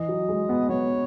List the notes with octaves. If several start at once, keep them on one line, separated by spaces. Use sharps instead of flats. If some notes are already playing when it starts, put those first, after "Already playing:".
Already playing: E3 D#5
F#3
G#3
B3
B3 C#5